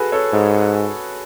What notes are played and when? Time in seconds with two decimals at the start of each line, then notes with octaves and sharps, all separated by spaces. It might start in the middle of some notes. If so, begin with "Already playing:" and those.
Already playing: F#4 G#4 A4 B4
0.12 A4 C#5
0.33 G#2